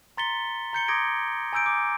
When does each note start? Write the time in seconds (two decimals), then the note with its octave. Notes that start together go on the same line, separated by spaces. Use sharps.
0.17 A#5 C6 A6 B6 C#7 G7
0.73 A#5 G6 C#7 G7
0.88 C6 D6 D#6 G#6 A#6 D7
1.53 G#5 A#5 E6 G6 D7
1.66 D6